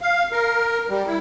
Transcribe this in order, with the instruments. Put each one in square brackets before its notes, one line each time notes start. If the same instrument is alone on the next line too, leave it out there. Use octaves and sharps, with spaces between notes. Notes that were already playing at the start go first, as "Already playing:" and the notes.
[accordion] F5
A#4
G3
E4